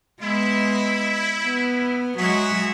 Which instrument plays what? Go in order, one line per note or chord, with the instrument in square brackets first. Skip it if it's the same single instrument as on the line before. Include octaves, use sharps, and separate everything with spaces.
[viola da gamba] G#3 B3 [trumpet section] E4
[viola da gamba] B3
[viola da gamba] F#3 G#3 [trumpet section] F#4 G#4 E5